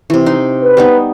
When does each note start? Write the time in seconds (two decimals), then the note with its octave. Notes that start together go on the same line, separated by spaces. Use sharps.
0.10 C3 E3
0.26 D#4 C6
0.61 B4
0.77 G3 B3 D#4